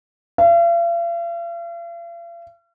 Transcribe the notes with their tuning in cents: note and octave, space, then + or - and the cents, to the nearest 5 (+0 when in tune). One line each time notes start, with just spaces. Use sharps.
F5 -45